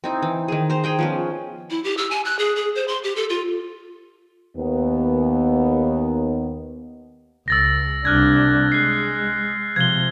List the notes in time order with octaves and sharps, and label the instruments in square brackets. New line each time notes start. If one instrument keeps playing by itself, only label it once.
[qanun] C4 D#4 E4
E3
D#3 G#4
C5 A#5
G#4 G5 A#5
F3 B3 C#4
[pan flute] E4
G4
E6
G#5
F#6
G#4
G#4
C5
C6
G4
A4
F4
[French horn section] D#2 B3
[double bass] C#2 [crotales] E6 A6 A#6
[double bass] C2 D4 [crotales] F6 F#6 G#6
[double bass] G#3 [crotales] F#6 C7
[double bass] C3 F3 [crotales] G#6 G7